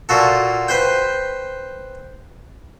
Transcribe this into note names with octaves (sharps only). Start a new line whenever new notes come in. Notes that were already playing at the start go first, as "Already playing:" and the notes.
A#2 F4 F#4 A4
B4 C5 G5